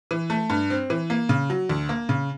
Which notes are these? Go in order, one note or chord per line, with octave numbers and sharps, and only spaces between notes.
E3
A3
G2
C4
E3
A#3
C#3
F#3
D2
A#3
C#3